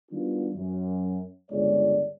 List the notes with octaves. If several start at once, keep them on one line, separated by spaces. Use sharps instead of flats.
D#3 G3 B3 D4 F4 F#4
F#2
G1 C#2 G#3 C#5 D5